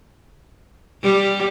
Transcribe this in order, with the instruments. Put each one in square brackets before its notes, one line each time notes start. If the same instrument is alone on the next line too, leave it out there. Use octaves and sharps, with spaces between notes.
[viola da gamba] G3